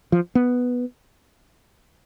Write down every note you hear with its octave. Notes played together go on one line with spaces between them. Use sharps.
F3
B3